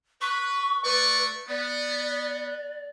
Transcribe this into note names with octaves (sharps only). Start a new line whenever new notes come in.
B4 C#6
A3 B4 D5 C#6
B3 D5